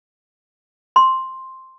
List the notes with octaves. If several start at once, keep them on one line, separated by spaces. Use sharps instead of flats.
C6